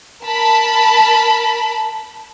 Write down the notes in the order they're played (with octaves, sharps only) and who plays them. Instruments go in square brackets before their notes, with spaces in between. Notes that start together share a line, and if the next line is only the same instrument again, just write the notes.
[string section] A#4 A5 B5